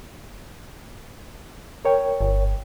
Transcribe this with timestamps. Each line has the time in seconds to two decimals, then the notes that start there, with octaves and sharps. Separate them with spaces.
1.85 A#4 C#5 G5
2.21 G1